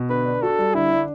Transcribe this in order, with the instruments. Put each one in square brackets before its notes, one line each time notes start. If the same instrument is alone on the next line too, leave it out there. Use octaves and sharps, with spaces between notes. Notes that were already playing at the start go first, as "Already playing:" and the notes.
Already playing: [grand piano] B2
[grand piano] D3 [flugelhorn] B4
[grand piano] D4
[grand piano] F#4 [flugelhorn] A4
[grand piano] G3
[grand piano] D3 [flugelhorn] E4
[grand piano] D4